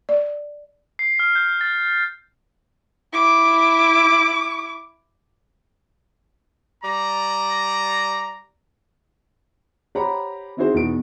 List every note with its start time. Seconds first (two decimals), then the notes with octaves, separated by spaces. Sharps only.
0.09 D5
0.99 C7
1.19 F6
1.36 G6
1.61 A6
3.13 E4 D6
6.83 G3 D5 A#5
9.95 G4 C5 C#5 F#5 A#5 B5
10.57 C4 D#4 E4 F#4 G#4 C5
10.74 E2 B2 B3 D#4 D7